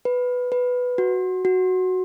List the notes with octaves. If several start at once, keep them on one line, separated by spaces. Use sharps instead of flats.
B4
B4
F#4
F#4